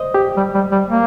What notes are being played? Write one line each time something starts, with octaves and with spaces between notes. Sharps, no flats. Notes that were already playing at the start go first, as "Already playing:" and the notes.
Already playing: C5 D5 D#5
G4
G3
G3
G3
A#3